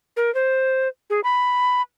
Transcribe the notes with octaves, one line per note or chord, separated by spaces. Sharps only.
A#4
C5
G#4
B5